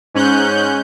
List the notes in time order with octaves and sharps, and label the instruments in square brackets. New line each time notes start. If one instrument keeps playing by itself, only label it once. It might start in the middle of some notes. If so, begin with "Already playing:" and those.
[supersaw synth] G#2 C#4 F#6 G6